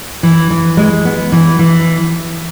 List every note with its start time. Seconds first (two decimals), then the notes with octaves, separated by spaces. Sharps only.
0.23 E3
0.50 E3
0.77 G#3
1.05 B3
1.32 E3
1.59 E3